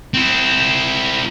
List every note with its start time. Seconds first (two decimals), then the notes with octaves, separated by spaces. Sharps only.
0.14 C4 E4